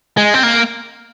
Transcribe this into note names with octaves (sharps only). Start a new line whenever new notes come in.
G#3
C4
A#3